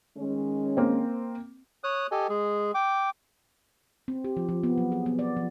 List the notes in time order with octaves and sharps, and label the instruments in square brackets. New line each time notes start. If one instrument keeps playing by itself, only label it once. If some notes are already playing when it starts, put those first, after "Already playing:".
[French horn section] D#3 G#3 C#4
[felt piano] A#3 C4
[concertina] C#5 D#6 F#6
G4 A4 D#5 G#5
G#3 G#4
G5 D6
[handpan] C4
G4
F3
F3
B3
F#3
G#4
B3
D5
F3